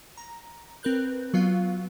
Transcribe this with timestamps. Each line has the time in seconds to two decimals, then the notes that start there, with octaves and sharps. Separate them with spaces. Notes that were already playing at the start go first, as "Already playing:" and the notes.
0.17 A#5
0.83 C4 A#4 B4 F#6 G6
1.34 F#3 B3 F4 F5